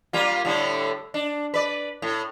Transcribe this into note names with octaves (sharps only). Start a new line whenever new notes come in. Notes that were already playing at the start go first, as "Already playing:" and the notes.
G3 A#3 F4
A2 D3 G3
D4
B4 D5
A2